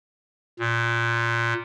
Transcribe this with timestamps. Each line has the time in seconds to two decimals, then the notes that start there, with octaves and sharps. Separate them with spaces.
0.59 A#2